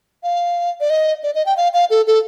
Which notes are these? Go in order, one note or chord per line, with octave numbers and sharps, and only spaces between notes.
F5
D5
D#5
D5
D#5
G5
F5
F5
A4
A4